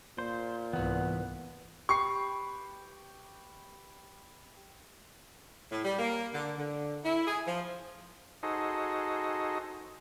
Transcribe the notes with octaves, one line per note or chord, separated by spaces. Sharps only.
A#2 C5
C2 G#2 E3 B3 F#5
G4 B4 C#6 C7
A2
G3
A#3
D3
D3
E4
G#4
F3
D#4 F#4 G#4 A4 C5 D#5